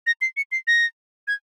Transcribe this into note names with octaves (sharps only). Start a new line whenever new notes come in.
A#6
C7
C#7
C7
A#6
G#6